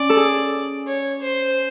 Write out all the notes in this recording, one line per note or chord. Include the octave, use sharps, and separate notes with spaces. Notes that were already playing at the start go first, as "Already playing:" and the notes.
Already playing: C#4 D5
A4
G#4
C#5
C5